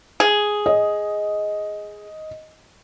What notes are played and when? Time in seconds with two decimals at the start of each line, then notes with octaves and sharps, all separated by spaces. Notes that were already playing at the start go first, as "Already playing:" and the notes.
0.20 G#4
0.66 D#5